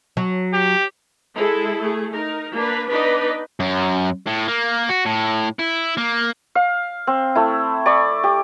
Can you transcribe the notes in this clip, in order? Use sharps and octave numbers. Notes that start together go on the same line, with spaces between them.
F#3
G4
G#3 E4 G#4 A4
A3 G#4
D#4 A#4
A#3 D4 B4
B3 D4 D#4 B4 D5 D#5
F#2
A2
A#3
F#4
A2
E4
A#3
F5
C4
A3 E4
D5 B5 C#6
G4